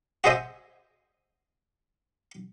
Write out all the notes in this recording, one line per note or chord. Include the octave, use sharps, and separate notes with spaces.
F#4 G#4 C5 D#5 E5